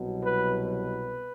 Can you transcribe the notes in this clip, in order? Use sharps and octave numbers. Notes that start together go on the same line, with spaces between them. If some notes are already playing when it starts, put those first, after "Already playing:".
Already playing: C2 B2 F#3
B4
B4